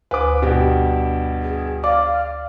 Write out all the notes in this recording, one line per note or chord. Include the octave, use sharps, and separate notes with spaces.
D2 B4 C5 G#5 D6
G2 B2 G4
G#4
D5 F5 D6